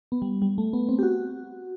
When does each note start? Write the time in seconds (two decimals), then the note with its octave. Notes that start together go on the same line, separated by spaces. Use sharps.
0.12 B3
0.22 G3
0.42 G3
0.58 A3
0.73 B3
0.89 C4
0.99 G4
1.03 F#4